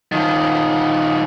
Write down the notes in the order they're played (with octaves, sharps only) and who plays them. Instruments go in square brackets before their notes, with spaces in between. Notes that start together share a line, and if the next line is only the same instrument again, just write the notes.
[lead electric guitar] D#3 F3